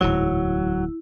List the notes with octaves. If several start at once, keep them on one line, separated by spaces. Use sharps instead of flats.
D1 E2 G#2 F#3 E4